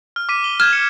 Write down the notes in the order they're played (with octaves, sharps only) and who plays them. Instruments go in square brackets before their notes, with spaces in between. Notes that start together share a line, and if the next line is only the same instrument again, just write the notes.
[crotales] F6
D6 B6 D#7
G7
[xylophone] F6 [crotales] G6 G#6 E7
[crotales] C#7